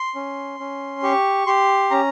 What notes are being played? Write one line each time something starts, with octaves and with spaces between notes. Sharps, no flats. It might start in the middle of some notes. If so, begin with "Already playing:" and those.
Already playing: C6
C#4
C#4
G4 C#6
G4 C6
C#4 A#5